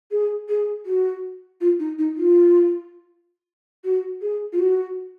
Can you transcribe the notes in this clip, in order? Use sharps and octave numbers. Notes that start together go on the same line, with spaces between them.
G#4
G#4
F#4
F4
D#4
D#4
F4
F#4
G#4
F4
F#4